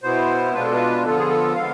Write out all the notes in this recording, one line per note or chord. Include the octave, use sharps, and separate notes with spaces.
B2 B3 E4 C5
B2 G#3 D4 F4 B4
A4
B4
D3 F3 B3 F4 A4
G#4
A4
D3 G#3 B3 F5